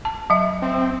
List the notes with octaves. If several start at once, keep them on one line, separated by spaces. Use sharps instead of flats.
A5
F#3 E5
C4